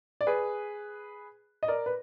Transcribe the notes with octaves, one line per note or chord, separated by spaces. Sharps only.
D5
G#4 B4
D#5
A#4 D5
B4